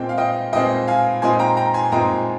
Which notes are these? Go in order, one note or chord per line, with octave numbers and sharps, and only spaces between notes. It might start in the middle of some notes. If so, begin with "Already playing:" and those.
Already playing: A#2 G#3 C4 G5
F5
D#5 G5
A#2 G#3 C4 D#5 G5
F5 G#5
A#2 G#3 C4 D#4 G#5 C6
G5 A#5
G5 A#5
G#5 C6
A#2 G#3 C4 D#4 G5 A#5